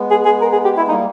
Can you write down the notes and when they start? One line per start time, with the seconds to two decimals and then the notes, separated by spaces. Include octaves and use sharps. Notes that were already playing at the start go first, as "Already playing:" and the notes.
Already playing: G#3 B3
0.10 G#4
0.25 G#4
0.41 A#4
0.52 G#4
0.65 G4
0.77 B3 E4
0.88 G3 A#3 D#4